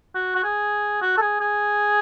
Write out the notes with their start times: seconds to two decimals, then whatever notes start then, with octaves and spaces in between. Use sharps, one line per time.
0.15 F#4
0.36 F#4
0.44 G#4
1.02 F#4
1.17 A4
1.21 G#4
1.41 G#4